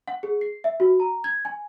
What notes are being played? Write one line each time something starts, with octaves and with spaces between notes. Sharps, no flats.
F#5
G#4
C7
E5
F#4
A#5
G#6
G#5